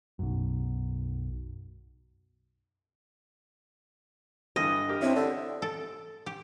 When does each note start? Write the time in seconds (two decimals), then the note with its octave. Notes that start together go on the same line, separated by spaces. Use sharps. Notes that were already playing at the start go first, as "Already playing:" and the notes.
0.19 B1 F#2
4.56 G2 D3 E3 D#5
4.89 G4 A#4
5.02 C4 D4 E4 C#5
5.16 D3 A4
5.62 A4
6.26 G4